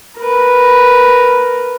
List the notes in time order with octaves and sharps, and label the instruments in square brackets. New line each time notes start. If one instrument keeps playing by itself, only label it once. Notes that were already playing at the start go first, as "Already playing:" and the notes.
[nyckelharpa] A#4 B4